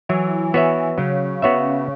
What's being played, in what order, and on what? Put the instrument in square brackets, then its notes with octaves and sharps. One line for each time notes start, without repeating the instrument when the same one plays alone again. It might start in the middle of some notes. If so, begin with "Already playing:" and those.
[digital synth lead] E3 [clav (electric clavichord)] F#3
[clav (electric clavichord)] B3 F#4 C#5 E5
[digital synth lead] C#3 [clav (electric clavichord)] F#3
[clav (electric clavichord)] B3 F#4 C#5 E5